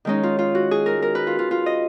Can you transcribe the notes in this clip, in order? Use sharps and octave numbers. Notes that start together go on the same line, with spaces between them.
D#3 G#3 C#4 D#4
F4
F4
F#4
G#4
A#4
A#4
B4
F4
F4
F4
D#5